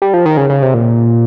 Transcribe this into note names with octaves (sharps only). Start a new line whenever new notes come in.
G3
F3
D#3
C#3
C#3
C3
A#2